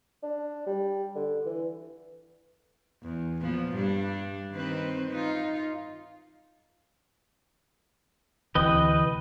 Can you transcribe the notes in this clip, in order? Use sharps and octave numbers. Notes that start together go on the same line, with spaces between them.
D4
G3
D3
E3
E2
A#2 F3 B3
G2 G3 D4
D#3 C4 B4
D#4 F4
D2 C3 E3 B4 D#5 G5